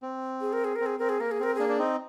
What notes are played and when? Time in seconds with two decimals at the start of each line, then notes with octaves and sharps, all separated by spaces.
0.02 C4
0.41 G#4
0.53 A#4
0.64 G#4
0.76 C4 A#4
0.86 G#4
0.98 C4 A#4
1.09 G#4
1.20 A#3 A#4
1.31 G#4
1.40 C4 A#4
1.55 A#3 D4 G#4
1.69 D4
1.78 C4 D#4